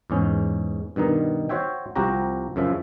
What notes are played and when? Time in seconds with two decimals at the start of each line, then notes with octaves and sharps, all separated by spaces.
0.10 E2 G#2 C#4
0.96 G2 B2 D#3 D#4
1.49 F#4 C5 C#5 E5 G5
1.96 C2 F3 C4 F#4 G4 A#5
2.56 F#2 C#3 F3 E5